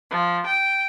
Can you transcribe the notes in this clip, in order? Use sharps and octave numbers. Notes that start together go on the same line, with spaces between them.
F3
G5